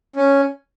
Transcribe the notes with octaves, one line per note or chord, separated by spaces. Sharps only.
C#4